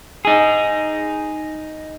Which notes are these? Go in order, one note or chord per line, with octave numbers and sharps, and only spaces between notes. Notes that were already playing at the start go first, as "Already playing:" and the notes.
D#4 G#4